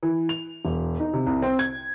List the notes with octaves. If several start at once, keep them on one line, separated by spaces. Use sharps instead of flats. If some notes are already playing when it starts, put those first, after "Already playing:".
E3
F7
E1
D#4
C3
C2
C4
G#6